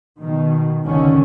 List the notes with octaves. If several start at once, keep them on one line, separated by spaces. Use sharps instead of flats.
B2 D#3
G#1 C#2 D3 D#3 C#4